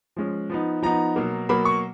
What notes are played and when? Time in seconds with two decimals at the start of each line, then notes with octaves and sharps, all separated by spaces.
0.16 F3 G#3 C#4
0.50 F3 B3 D#4
0.82 F3 B3 D#4 A#5
1.16 B2 F#3 A#3
1.49 B2 F#3 A#3 B5
1.65 C#6